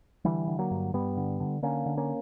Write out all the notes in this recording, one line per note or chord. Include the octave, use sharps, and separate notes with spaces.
D3 E3 G3
D3
F#3 A#3
G2
G2 G3 B3
D3
D3
D3 A#3 C#4
D3
A#3 C#4